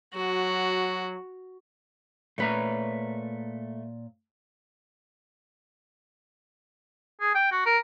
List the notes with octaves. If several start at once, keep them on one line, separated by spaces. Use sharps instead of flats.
F#3 F#4
A#2 A3 B4 C#5 A#5
G#4
G5
F#4
A#4